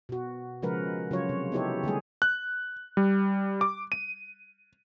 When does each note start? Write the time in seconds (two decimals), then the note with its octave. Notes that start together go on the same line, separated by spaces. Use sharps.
0.09 B2 F#4
0.62 C#3 F3 G#3 A#4 B4 F#5
1.11 C#3 F#3 F4 F#4 C#5
1.29 C3
1.52 B3 D#4 E4 G4 A4 C#5
1.83 D3 G3 A3 G#4
2.22 F#6
2.97 G3
3.61 D6
3.92 D#7